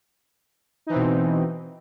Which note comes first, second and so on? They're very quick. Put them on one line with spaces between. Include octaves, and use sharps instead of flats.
D#4 E3 C4 B2